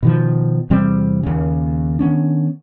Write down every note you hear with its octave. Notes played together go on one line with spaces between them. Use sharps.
B2 D#3 F3
E2 C3 G3 C4
D#2 C#3
D#3 B3 C#4 D4